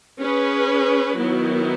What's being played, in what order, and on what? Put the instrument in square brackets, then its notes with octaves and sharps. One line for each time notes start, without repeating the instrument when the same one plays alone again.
[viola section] C#4 G#4 B4
D#3 F#3 B3 E4